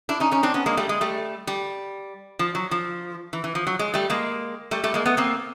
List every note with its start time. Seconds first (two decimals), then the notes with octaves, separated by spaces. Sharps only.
0.09 D4 E4
0.20 C#4 D#4
0.31 C#4 D#4
0.43 C4 D4
0.54 B3 C#4
0.66 G#3 A#3
0.77 G3 A3
0.89 G#3
1.01 G3 A3
1.47 G3
2.39 F3
2.55 F#3
2.71 F3
3.33 E3
3.44 E3
3.55 F3
3.67 F#3
3.79 G#3
3.94 G3 A3
4.10 G#3 A#3
4.71 G3 A3
4.83 G3 A3
4.94 G#3 A#3
5.06 A3 B3
5.17 A#3 C4